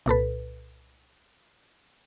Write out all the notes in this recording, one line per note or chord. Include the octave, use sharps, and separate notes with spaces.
C2 A#2 A4 B4